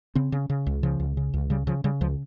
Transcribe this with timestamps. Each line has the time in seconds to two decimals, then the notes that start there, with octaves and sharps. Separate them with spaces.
0.15 C#3 C4
0.32 C#3
0.50 C#3
0.66 C#2
0.83 C#3 F3
1.00 C#2
1.17 C#3
1.34 C#2
1.50 C#3 G3
1.67 C#3 F3
1.84 C#3 G3
2.01 C#2 F3